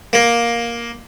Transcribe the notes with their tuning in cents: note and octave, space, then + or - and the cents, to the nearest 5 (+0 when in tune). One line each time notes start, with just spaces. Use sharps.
A#3 +10